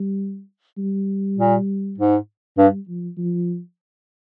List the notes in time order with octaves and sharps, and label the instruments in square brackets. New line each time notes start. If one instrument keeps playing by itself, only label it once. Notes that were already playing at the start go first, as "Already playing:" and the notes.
Already playing: [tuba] G3
G3
[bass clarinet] A#2
G#2
[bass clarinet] G2 [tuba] G3
[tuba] F3
F3